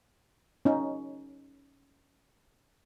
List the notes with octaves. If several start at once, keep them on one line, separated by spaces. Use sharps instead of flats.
C#4 D#4